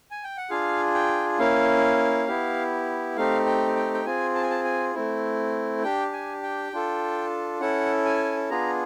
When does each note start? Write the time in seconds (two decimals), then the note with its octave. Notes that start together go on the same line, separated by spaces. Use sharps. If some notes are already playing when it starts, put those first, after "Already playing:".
0.11 G#5
0.24 G5
0.37 F#5
0.50 D4 F4 G#4 F5
0.94 G5
1.39 A#3 C#4 E4 F5
2.28 B3 E4 G4
3.16 A3 C4 D#4 G4 F5
3.46 G5
3.76 G5
3.94 G5
4.06 C4 F4 G#4 G#5
4.35 A5
4.43 G#5
4.50 A5
4.64 G#5
4.94 A3 C4 E4
5.83 D4 G4 G5
6.13 G#5
6.43 G5
6.72 D4 F4 A4
7.61 C#4 E4 A4 F#5
8.05 G#5
8.50 B3 D4 F4 G#4 A#5